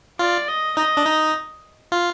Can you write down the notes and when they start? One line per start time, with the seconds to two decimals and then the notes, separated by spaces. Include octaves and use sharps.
0.19 F4 D5
0.48 D#5
0.77 D#4 D#5
0.97 D4
1.06 D#4
1.92 F4